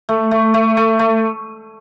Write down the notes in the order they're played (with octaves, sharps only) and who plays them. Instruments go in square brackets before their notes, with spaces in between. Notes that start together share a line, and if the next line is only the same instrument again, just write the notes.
[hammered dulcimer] A3
A3
A3
A3
A3